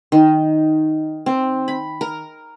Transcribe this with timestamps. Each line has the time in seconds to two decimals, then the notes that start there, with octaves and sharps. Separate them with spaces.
0.12 D#3
1.26 C4
1.68 B5
2.01 A#4